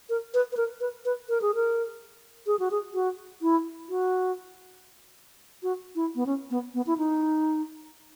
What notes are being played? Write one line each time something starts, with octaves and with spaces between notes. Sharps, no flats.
A#4
B4
B4
A#4
B4
B4
A#4
G#4
A#4
G#4
F#4
G#4
F#4
E4
F#4
F#4
E4
B3
C#4
B3
B3
E4
D#4